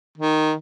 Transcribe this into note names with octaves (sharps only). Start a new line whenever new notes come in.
D#3